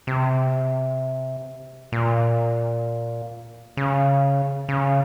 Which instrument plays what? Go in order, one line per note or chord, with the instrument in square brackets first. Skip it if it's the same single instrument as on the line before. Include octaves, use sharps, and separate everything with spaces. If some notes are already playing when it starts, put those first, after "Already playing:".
[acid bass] C3
A#2
C#3
C#3